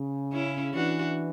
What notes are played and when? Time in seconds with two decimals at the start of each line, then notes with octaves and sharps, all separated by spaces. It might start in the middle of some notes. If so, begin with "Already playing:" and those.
Already playing: C#3
0.32 C#4 E4
0.74 E3 D4 F#4